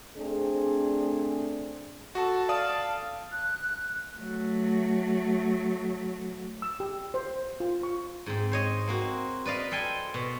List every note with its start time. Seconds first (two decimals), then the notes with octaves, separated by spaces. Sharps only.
0.17 A3 C4 D4 G#4
2.15 F#4 A4
2.49 D5 F5 A5 D#6
3.32 F#6
4.17 F#3 A3
6.62 E6
6.80 G4
7.14 C5
7.60 F4
7.83 C#6
8.26 G#2 C4
8.52 C5 C#5 D#5
8.87 A#3 C4 F#4
9.45 B4 D5 D#5 F5
9.71 A4 C5 G5 G#5
10.14 B2